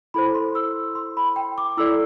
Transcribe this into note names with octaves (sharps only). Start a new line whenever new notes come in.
E4 A4 C5 B5
C6
E6
C6
B5
G5
D6
E4 A4 D5 E6